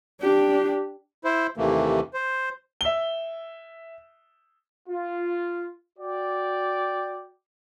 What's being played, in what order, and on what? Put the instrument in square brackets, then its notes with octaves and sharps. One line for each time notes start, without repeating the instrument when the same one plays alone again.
[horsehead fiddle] D4 G4
[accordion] E4 C5
D#2 C3 E3 A3 A#3
C5
[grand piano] E5 G7
[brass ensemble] F4
F#4 D5 G5